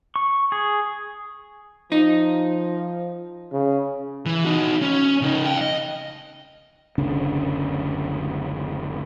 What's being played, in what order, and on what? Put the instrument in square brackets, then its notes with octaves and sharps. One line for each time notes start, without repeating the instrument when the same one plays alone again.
[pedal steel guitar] C#6
G#4
[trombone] F3 [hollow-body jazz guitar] D#4
[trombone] C#3
[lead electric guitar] E3
D#4 F#4
C#4
C#3 D#4
F5 G5
D#5
[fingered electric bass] F#1 D2 C#3 D4